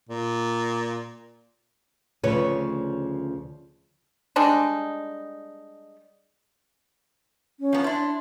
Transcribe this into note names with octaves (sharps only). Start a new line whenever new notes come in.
A#2
D2 C#3 F3 B4 C#5
G3 G#3 D4 D#4
C#4
F3 B3
D4 E4 C6